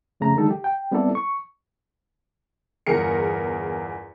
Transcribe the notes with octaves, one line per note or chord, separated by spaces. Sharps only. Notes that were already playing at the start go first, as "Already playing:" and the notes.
F2 C#3 A3 A#5
D3 D#3 F#3 G#3 D#4 A4
G4
G5
G3 B3 C4 E4 A4 D5
C#6
G1 E2 G#4 A#4 C#7